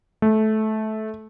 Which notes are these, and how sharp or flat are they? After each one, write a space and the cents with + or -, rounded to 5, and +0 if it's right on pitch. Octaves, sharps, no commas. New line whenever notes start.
A3 -20